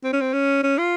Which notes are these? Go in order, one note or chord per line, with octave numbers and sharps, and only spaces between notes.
C4
C#4
C4
C#4
C#4
F4